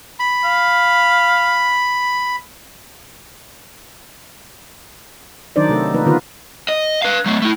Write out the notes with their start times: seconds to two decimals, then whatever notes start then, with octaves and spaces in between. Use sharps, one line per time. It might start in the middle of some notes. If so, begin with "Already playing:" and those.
0.19 B5
0.44 F5
5.56 D#3 F#3 D4 D#4 C5 D5
5.69 C3 A3 A4
5.94 C3 F3 A#3 D#4 B4
6.06 D3 D#3 B3 F4 B4
6.69 D#5
7.02 B4 F5
7.26 F#3 A3
7.42 A3 E4